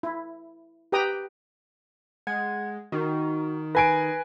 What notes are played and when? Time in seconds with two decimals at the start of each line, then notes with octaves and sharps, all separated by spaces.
0.03 E4
0.92 G4 B4 G5 A#5 D#6
2.27 G#3 F#5 G#6
2.92 D#3 D#4 F#4
3.75 B4 G#5 A#6 C7 D7